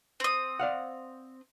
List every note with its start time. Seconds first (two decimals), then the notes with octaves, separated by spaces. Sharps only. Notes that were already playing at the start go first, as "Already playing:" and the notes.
0.20 C4 D#6
0.60 D5 F5 F#5